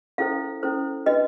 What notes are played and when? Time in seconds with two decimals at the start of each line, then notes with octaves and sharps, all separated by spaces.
0.18 C#4 E4 A4 C5 F5
0.63 C#4 E4 A4 C5
1.06 D4 F#4 B4 D#5